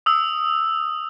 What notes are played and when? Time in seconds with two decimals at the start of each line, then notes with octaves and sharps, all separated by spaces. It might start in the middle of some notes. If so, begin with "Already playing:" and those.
0.06 D#6 E6